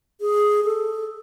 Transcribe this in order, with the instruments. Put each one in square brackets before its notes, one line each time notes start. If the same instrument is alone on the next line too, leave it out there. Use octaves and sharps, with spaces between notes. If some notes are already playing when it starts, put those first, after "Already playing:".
[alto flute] G#4
A4